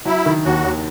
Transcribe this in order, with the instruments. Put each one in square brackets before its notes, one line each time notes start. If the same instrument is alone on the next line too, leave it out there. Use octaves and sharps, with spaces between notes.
[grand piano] F#3 [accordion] E4
[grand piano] D#3
[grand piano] D#2 [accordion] F#4
[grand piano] D#2